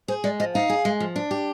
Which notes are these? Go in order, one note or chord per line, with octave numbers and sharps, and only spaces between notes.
G#4 C5
G#3 D5
F3 D#5
D#4 F5
G#4
G#3
F3
D4
G4